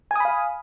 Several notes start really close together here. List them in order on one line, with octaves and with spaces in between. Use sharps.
G#5 D#6 B5 F5